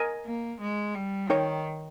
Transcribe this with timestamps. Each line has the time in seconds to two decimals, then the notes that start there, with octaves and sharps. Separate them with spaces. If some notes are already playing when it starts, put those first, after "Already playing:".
Already playing: A#4 D#5 G#5
0.25 A#3
0.61 G#3
0.95 G3
1.29 D#3 D#4 A#4 C#5 G5